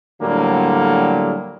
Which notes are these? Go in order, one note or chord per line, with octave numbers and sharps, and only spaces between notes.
A2 D3 F#3 G3 A#3